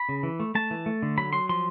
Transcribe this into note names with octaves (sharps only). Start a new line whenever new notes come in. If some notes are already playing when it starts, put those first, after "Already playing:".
Already playing: B5
C#3
E3
A3
A3 A5
E3
A3
D3
F#3 B5
F#3 C6
F3 C6